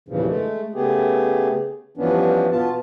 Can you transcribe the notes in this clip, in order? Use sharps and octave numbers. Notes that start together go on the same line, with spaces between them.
E2 G2 A#2 C#3 E3 F3
G#3 A3
C#3 A3 B3 G4 G#4
G2 E3 F3 B3 C#4 D4
B2 B3 F4 A5